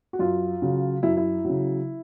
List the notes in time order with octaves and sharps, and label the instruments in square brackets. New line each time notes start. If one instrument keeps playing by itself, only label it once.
[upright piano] F#4
F#2 F4
C#3 F#3
F#2 E4
E4
C#3 F#3